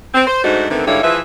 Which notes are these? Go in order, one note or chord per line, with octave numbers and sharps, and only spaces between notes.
C4
C5
G#2 A3 D4 D#4 F#4 C5
D3 D#3 A3 B3 C4
G#2 D3 G3 E4 C#5 F5
E3 F3 G#4 B4 E5